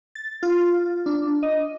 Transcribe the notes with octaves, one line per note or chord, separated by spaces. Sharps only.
A6
F4
D4
D#5